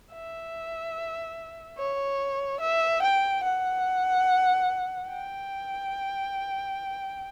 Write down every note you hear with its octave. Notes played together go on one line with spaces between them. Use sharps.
E5
C#5
E5
G5
F#5
G5